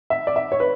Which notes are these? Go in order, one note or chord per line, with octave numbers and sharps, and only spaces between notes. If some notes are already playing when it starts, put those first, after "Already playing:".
E5
D5
E5
C#5
B4